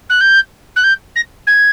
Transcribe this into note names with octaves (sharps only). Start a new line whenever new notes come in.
F#6
G6
F#6
G6
A#6
G#6